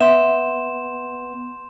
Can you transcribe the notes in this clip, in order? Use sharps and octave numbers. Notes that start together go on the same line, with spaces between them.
B3 E5 C6 G6 E7